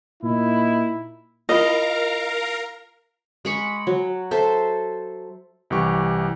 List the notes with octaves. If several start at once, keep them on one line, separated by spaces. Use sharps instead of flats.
A#2 D#4 E4
E4 F4 A#4 D#5 F5 A#5
G#3 B5 C#6
F#3
A4 C5 E5
C2 E3 G4 C#6